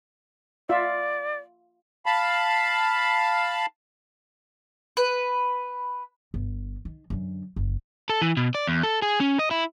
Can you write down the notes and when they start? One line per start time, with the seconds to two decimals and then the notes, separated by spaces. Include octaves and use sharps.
0.69 F4 D5 E5
2.06 F5 A5 B5
4.97 B4
6.34 G1
6.85 D#3
7.10 F#2 D3
7.56 F#1
8.09 A4
8.22 E3
8.37 B2
8.55 D5
8.67 E2
8.83 A4
9.02 G#4
9.20 C#4
9.39 D#5
9.51 E4